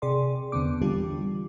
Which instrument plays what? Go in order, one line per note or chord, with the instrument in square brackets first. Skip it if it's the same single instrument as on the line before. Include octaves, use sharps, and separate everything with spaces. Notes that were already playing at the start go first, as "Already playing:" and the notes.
[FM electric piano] C3 G#4 D5 C6
E2 D3 B3 C4 D6
D3 E3 G3 D4 F4 G4